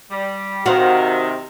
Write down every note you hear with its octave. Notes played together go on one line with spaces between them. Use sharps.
G3
C3 D#3 F#4 C5 F5 F#5